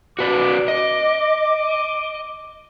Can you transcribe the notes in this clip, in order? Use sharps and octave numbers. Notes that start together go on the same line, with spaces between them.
F#4 B4 D5 D6
D#5